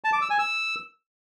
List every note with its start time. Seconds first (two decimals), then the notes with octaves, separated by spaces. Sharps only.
0.04 A5
0.13 D6
0.21 E6
0.30 G#5
0.39 E6